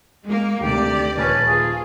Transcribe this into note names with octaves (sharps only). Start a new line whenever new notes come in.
G#3 A#3
D2 C3 D#3 G4 D5
D#1 A#2 F3 C#4 B4 A5 A6
F4 G#4